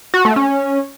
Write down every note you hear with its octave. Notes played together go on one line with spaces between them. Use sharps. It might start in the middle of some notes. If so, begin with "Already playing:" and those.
F#4
A3
C#4